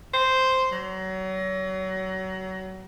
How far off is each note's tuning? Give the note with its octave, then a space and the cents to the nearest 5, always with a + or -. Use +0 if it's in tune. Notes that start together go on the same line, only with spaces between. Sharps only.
C5 -5
F#3 +30